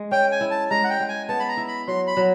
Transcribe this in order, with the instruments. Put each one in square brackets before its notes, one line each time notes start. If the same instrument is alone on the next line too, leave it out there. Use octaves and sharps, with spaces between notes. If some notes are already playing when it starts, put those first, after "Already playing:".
Already playing: [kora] G#3
[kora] C#4 [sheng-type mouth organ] G5
[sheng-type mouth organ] G#5
[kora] E4
[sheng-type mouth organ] A5
[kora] G#3 [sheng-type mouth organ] A#5
[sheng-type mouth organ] F#5
G5
[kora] G#3
[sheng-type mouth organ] G#5
[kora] B3 [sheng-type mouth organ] A5
[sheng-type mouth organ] B5
A#5
[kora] E4
[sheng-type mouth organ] B5
[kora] F#3 [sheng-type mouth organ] C6
[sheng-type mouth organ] B5
[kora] F#3